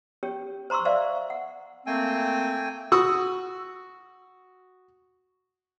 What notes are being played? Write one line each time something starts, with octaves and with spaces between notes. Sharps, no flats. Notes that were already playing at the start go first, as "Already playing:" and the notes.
C#4 G4 C#5
C5 A#5 C6 C#6 E6
C5 D5 E5 F5 C6
F#5
A3 A#3 C4 G5 G#5
F#4 C#6 D#6 E6